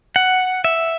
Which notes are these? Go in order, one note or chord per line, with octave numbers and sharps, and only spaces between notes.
F#5
E5